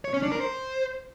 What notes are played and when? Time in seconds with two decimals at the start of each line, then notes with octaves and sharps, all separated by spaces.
0.05 C#5
0.14 C#4
0.23 D4
0.32 A#4
0.41 C5